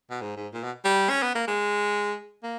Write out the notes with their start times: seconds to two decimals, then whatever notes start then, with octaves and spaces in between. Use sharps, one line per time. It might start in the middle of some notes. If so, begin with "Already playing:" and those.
0.10 B2
0.21 G#2
0.37 G#2
0.53 A#2
0.64 B2
0.85 G3
1.10 C#4
1.23 B3
1.35 A#3
1.48 G#3
2.43 A#3